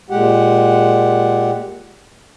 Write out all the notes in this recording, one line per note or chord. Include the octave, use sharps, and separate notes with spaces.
A#2 G#3 G4 F#5